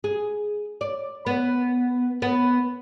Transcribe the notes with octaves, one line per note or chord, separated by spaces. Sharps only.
G#4
D5
B3
B3